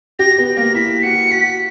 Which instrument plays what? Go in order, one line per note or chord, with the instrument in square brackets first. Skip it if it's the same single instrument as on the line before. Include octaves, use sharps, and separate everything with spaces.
[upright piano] G4 [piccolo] A#6
[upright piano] B3
[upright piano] A#3 [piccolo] A#6
[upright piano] E4 [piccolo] B6
[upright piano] F#4 [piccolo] C#7
[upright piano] F#4 [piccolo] B6